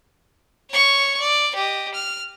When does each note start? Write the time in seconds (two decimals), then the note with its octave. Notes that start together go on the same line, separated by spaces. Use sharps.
0.70 C#5 C#6
1.20 D5
1.55 G4 D#5
1.94 F6